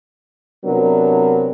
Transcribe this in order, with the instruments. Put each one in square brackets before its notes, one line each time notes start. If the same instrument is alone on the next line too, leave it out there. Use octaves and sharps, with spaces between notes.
[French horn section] C3 F#3 B3 D4 A#4